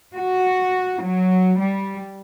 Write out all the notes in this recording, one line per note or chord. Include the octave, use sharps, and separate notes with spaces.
F#4
F#3
G3